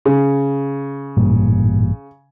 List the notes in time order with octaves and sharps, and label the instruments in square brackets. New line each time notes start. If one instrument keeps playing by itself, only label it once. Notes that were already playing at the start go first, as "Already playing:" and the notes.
[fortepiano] C#3
[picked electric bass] A1 G2 A#2